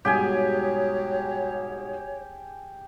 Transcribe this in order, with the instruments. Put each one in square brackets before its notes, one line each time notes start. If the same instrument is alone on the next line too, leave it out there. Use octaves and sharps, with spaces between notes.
[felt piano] G#2 B2 G3 [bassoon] F#3 [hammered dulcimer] G4 G#4 G#5 [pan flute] C#5